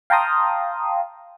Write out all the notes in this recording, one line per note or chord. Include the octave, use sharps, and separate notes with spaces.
F5 G5 A5 A#5 C6 D#6